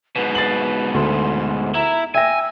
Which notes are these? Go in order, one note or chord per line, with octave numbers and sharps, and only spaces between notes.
G#2 B2 B4
A6 C7 F#7
D2 C6
E4 A#5
E5 G5 G#5 E6 A#6